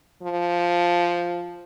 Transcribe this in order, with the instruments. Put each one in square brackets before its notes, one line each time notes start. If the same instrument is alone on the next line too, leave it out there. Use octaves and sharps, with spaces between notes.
[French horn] F3